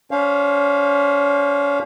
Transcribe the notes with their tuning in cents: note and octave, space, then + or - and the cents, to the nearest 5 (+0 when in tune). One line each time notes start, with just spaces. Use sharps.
C#4 +40 C5 +40 F5 +0